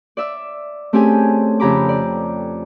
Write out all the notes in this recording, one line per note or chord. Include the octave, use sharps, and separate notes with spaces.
D5 E5 E6
A3 C4 C#4 G4 G#4 G#5
F2 C#3 G4 A#5 B5 D6
D5